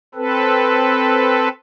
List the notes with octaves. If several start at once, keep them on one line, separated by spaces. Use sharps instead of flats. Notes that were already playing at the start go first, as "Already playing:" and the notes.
C4 A4 B4